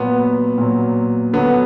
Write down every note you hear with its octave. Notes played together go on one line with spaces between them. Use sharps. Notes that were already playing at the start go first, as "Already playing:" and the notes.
Already playing: A#2 F#3 B3
A#2 F#3
D3 F#3 B3